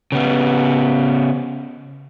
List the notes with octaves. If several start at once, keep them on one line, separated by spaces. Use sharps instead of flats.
C#3 B3